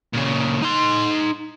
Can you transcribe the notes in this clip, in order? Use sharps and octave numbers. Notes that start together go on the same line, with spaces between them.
A#2 C#3
D#4 C6